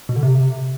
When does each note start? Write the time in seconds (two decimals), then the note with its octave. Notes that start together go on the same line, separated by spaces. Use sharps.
0.09 B2
0.16 D3
0.23 C3